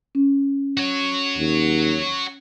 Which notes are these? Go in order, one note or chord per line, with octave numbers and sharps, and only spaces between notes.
C#4
F#4 C#5
D#2